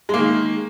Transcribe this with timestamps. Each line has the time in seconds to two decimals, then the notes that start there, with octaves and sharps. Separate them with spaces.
0.09 G#3
0.14 A#3
0.18 D#3